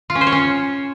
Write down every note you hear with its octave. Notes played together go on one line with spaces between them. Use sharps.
F4
C#4
C5
C#5
C#4